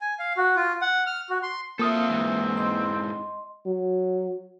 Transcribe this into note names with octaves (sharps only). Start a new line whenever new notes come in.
G#5
F5
F#4
F4
F#5
F6
F#4
C6
A#3 C4 F4 A4 E5 F5 D#6
G#2 E3
D#5 C6
F#3